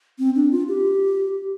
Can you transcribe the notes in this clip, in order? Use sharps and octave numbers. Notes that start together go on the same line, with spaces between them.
C4
D4
F4
G4